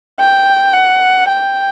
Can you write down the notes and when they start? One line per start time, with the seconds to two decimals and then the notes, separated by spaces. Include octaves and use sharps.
0.19 G5
0.74 F#5
1.29 G5